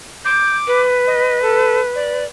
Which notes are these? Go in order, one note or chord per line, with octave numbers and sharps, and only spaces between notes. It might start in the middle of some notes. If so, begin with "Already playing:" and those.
D6 G6
B4
D#5
A4
D5